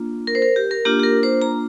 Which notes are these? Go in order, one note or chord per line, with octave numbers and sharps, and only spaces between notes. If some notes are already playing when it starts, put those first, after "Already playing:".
Already playing: A#3 D4 F4
A#4
C5
A#4
G4
A#4
A#3 D4 F4 G4
G4
A#4
C5
A#5